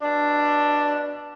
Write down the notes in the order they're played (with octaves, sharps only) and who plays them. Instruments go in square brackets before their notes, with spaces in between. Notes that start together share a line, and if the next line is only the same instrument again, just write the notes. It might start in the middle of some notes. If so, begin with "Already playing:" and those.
[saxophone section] B2 D4